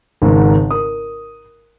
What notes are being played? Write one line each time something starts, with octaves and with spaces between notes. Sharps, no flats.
G#1 G#2 C#3
A#4 D#6